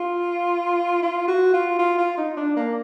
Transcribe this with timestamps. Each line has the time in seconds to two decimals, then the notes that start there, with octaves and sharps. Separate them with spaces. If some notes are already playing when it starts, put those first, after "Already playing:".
Already playing: F4
1.02 F4
1.28 F#4
1.54 F4
1.79 F4
1.98 F4
2.17 D#4
2.37 D4
2.56 A#3